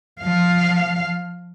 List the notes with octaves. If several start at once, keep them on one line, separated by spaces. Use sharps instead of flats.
F3 F5